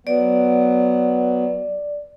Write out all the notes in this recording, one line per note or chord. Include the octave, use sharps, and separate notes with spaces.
F#3 B3 D5